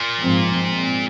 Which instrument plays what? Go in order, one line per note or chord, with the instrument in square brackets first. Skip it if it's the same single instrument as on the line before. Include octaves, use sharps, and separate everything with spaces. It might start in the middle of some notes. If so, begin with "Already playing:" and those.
Already playing: [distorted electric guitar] A#2
[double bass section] G#2 F3 G#3 C4
G#2 G#3 C4